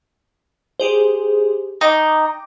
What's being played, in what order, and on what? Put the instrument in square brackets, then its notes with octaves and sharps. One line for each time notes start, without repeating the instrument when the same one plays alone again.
[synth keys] G4 G#4 C5
[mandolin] D#4 [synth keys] G5 D6